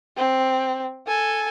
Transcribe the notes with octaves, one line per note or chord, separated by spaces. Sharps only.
C4
A4 G#5